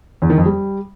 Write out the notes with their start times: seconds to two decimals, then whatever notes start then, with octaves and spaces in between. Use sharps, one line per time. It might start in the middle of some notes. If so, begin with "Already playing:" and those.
0.22 E2
0.30 D#3
0.38 F2
0.45 G3